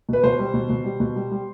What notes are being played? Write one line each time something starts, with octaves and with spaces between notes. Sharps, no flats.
B2 B4
B2 C5
G3
B2
B2
G3
B2
G3
G3